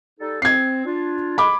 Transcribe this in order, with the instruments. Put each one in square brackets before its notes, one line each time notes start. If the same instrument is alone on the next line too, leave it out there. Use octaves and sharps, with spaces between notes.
[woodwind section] G3 D#4 A4
[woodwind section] C4 [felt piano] G#6 C7
[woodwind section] D4 F4
[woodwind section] G#3 [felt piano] B5 D6